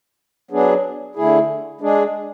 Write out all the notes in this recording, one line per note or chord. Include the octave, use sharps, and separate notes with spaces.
F#3 B3 D4 G#4
D3 A3 E4 G#4
G#3 D4 G#4